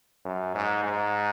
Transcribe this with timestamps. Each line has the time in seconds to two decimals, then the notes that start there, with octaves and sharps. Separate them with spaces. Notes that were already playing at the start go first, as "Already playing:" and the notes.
0.25 F#2
0.55 G#2
0.84 G#2